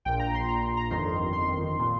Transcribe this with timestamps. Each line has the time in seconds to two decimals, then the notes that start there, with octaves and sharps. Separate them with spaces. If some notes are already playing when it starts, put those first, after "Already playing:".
0.05 A#1 A#2 G5
0.19 A#5
0.34 C6
0.48 A#5
0.63 C6
0.77 A#5
0.90 G1 F2 D#3 C6
1.33 C6
1.79 A#2